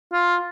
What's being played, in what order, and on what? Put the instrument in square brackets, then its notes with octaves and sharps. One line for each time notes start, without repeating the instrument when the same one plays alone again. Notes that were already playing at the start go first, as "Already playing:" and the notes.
[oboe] F4